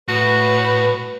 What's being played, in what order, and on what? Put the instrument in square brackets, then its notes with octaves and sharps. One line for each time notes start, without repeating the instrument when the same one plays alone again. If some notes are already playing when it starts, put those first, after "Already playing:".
[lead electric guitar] A2 [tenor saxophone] F#4 [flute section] B4